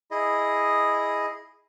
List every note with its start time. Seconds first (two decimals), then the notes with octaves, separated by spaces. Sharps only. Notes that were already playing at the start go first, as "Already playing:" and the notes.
0.11 E4 G#4 D#5